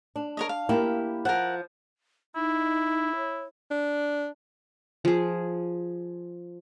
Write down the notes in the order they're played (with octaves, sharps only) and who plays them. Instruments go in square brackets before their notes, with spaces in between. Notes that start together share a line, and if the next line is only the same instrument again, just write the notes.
[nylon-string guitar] D4
[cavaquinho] A#4 C#5 D#5
F5
[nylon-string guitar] A#3 E4 G4
[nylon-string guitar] F3 [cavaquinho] A#4 F#5
[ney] D#4 [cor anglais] E4
[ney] C#5
[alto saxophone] D4
[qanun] F3 G#4